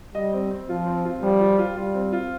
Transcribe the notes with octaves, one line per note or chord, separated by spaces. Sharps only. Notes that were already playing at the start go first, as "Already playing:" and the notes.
G3 D#5
C4
C4
F3 F4
C4
F4
F3 G3
F4
F4
G3 F4
C4
F4